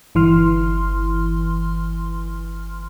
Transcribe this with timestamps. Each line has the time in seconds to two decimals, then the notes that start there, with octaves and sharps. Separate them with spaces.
0.15 G1 E3 C6 F6